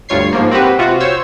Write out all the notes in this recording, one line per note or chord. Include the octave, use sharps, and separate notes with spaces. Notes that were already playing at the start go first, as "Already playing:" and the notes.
D2 G2 F4 C#5 G#6 C7
G#2 F3 A#3
C4 F#4 G4 B4
C3 F4 F#4
C5 C#5 E6